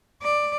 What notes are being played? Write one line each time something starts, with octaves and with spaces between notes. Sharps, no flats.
D5